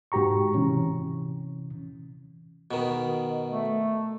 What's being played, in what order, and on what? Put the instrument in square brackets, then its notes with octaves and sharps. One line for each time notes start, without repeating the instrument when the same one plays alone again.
[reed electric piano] G#2 F#4 G4 A#5 C#6
C3 E3 C#4
[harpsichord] B2 D#3
[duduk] A3